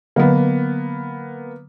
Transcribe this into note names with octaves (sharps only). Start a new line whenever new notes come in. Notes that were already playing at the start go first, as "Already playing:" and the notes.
D3 F#3 A#3 B3 F#5